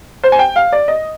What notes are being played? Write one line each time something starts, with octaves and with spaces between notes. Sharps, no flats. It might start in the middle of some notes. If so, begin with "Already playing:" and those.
C5
G#5
G5
F5
D5
D#5